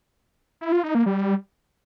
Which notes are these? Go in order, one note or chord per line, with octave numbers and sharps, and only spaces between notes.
E4
F4
D#4
A#3
G3